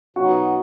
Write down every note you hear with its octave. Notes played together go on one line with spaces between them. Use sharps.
B2 F#3 B3 D#4 F#4